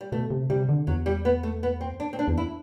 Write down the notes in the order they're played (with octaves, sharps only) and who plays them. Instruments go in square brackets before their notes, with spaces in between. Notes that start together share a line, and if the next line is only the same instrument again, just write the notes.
[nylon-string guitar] G3
[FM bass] B2 [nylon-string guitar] A3
[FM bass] C3
[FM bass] C3 [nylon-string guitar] G3
[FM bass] D3
[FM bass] E2 [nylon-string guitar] F#3
[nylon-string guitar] G3
B3
A3
B3
C4
D4
C4
D4
[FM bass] E2
[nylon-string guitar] E4